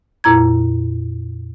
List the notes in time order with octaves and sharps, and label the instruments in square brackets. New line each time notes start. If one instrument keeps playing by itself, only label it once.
[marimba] F2 A#2 E4 A#5 G#6